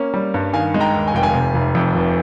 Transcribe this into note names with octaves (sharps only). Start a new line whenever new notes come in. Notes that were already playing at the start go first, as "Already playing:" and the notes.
Already playing: A#3 C#4
G3
G2
D#3 F5 G#5
G#3
G5 A#5
D#2
G#5
F1 G5
F5 G#5
C3
F1
F2
F1